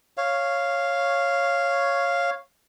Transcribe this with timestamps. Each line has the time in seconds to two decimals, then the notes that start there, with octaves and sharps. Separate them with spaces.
0.17 C#5 F5